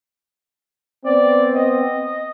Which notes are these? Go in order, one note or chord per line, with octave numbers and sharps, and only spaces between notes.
B3 C4 D5
D#5